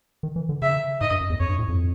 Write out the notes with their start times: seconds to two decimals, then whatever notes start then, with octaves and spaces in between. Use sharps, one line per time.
0.23 D#3
0.36 E3
0.49 D3
0.62 C#3 E5
1.01 G#2 D#5
1.11 G2
1.21 F#2
1.30 E2
1.40 F2 C#5
1.49 G2
1.59 A2
1.69 F2